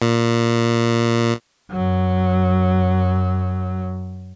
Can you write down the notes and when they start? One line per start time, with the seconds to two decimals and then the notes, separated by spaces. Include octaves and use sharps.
0.02 A#2
1.72 F#2 F#3